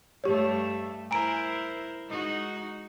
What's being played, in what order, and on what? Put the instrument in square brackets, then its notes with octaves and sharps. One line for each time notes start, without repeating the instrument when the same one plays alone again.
[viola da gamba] G2 A3 [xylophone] G4 C#5
[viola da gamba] E4 A#4 C5 [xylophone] G#5 A#5 D7
[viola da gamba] G#3 D#4 F#4